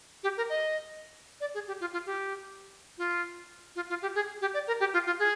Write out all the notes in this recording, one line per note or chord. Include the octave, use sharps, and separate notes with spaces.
G4
A#4
D#5
D5
G#4
G4
F4
F4
G4
F4
F4
F4
G4
G#4
G4
D5
A#4
G4
F4
F4
G#4